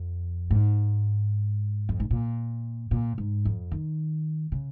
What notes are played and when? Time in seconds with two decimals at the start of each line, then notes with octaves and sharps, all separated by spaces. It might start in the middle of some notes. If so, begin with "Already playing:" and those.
Already playing: F2
0.51 G#2
1.89 F2
2.00 G#2
2.11 A#2
2.91 A#2
3.18 G#2
3.45 F2
3.72 D#3
4.52 C#3